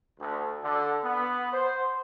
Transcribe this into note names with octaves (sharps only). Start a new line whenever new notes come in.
D2
D3
B3
C5